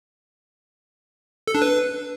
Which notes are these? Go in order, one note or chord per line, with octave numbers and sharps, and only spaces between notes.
A4
D4
B4